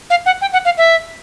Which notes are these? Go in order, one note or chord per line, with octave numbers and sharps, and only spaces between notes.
F5
F#5
G5
F#5
F5
E5